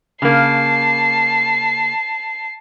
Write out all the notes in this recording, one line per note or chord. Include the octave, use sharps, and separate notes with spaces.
C#3 A#3 A5 C7